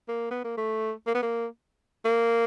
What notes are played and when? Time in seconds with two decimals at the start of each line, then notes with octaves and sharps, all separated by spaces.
0.08 A#3
0.31 B3
0.44 A#3
0.58 A3
1.07 A#3
1.15 B3
1.23 A#3
2.05 A#3